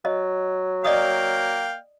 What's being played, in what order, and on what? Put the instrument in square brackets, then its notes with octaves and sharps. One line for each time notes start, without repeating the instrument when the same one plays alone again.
[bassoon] F#3 [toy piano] D#5
[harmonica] A#3 F5 G5 [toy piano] D5 D#5 D#6